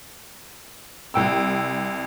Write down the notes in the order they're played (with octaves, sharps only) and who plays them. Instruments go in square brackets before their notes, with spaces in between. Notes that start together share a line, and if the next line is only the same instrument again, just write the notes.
[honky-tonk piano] C2 G5 E6